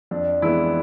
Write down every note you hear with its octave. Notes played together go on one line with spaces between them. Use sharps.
F2 D4
E3 G#3 B3 E4